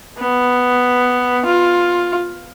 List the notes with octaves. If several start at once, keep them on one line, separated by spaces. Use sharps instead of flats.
B3
F4